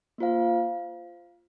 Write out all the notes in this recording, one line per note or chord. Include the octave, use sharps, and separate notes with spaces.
A#3 F4 C5 F5